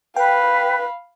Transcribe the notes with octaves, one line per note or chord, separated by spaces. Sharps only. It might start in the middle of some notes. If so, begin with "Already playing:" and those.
B4 F5 G5 B5